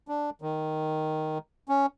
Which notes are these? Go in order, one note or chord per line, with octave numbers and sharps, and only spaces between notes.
D4
D#3
C#4